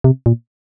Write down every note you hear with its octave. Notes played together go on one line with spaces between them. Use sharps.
C3
A#2